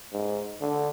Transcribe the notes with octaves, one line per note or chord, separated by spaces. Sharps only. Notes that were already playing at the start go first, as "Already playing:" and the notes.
G#2
D3